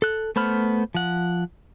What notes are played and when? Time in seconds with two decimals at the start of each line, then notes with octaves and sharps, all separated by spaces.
0.02 A4 F#6
0.36 A3 B3 C5 B5 F6
0.94 F3 F#5